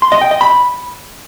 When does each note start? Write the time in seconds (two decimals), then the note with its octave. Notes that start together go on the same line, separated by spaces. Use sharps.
0.02 C6
0.12 D#5
0.21 G5
0.31 D#5
0.41 B5